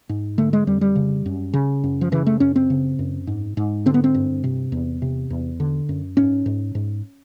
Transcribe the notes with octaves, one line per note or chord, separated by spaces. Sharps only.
G#2
D3 A3
G#3
F2 G3
G3
C#3
F#2
C#3
F#2
F3
C#3 E3
A3
F#2 C#4
C4
C#3
F#2
G#2
G#2
D3 C4
B3
C4
G2
C3
E2
C3
E2
D3
F#2
G#2 C#4
G#2
G#2